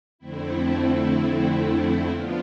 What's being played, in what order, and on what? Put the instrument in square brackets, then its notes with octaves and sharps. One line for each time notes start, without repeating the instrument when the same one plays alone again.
[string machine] F2 D3 A3 C4 E4
F3 B3 D4 F4